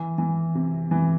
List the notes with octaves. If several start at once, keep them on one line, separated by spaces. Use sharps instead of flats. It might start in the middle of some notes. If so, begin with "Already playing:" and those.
Already playing: E3
E3
C3
E3